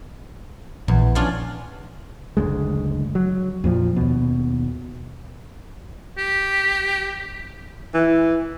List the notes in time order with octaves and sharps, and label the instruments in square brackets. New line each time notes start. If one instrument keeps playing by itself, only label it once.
[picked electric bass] A#1 [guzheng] E2
[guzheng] C#4 D4 F4
[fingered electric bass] F#1 D2 G#3
F#3
F2 A#2 F3
D#2 B2
[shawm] G4
[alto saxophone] E3